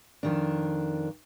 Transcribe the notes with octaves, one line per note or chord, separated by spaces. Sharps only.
F2 D#3 D4